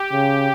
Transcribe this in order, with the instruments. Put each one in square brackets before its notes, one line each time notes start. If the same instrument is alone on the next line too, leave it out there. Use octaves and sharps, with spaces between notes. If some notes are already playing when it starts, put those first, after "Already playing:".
Already playing: [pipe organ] G4
[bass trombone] C#3